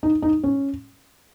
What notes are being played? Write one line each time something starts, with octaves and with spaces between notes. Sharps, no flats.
D#4
D#4
C#4